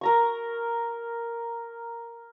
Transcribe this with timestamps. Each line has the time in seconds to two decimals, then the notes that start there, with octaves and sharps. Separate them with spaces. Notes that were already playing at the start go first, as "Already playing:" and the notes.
0.01 A#4 A#5 C#6